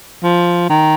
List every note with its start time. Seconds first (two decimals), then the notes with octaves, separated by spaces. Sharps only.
0.23 F3
0.69 D#3